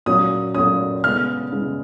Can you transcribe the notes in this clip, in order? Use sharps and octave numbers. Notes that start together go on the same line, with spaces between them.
A#2 F#3 C#4 D#6
A#2 F#3 C#4 D#6
C#3 G#3 B3 F6
C#3 G#3 B3